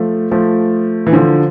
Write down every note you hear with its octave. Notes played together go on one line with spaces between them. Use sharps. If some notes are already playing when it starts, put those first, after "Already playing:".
Already playing: F3 A3
F3 A3
E3
D3 F3